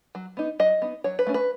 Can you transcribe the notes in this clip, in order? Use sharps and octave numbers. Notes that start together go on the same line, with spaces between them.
F#3
B3 D#4
F#3 D#5
B3 D#4
F#3 C#5
B4
A3 C#4
B4